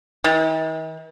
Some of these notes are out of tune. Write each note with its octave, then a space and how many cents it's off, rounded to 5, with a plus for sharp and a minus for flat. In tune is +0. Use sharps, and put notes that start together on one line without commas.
D#3 +45